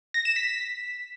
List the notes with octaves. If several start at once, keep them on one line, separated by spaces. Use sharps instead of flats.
A#6
E7
B6